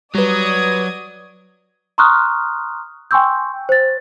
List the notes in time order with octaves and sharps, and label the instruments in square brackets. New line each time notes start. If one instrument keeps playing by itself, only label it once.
[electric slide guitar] F#3 [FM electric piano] G3 B4 [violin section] D5 D#6 G#6
[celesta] A#5 C6 C#6 D#6 F6 F#6
G5 G#5 C6 C#6 E6 G6
C5 A6